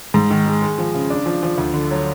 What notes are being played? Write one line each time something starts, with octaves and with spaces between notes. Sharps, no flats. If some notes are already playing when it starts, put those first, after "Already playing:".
G#2
D#3
G#3
G#3
F3
C#3
D4
F3
F3
D2
D3
F#3